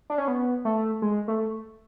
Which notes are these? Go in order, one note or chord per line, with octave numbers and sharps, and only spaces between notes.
D4
C#4
B3
A3
G#3
A3